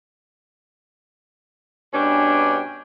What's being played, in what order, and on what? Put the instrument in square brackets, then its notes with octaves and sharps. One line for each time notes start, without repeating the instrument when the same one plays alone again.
[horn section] G2 B2 C#4 D4 G5 G#5